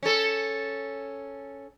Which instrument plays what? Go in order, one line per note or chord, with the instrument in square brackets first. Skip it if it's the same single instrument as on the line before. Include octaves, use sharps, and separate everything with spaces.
[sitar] C#4 A4